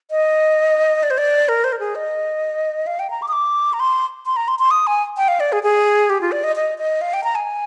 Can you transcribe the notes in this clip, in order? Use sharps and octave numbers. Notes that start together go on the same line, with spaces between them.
D#5
D5
C5
D5
A#4
C5
A#4
G#4
D#5
F5
G5
A#5
D6
D#6
D6
A#5
C6
C6
A#5
C6
C6
D#6
G#5
G5
F5
D5
G#4
G#4
G4
F4
D5
D#5
D#5
D#5
F5
G5
A#5
G#5